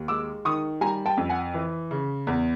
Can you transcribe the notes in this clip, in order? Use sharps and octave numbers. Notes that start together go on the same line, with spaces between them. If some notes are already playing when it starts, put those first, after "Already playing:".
Already playing: D#2
G#3 D6 E6
D#3 C#6 D#6
G3 G#5 A#5
G5 A5
F2
F#5 G#5
E3
C#3
E2